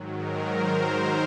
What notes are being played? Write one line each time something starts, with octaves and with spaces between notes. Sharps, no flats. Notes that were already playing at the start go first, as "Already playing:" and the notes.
Already playing: G#2 D#3 F#3
A#4
C5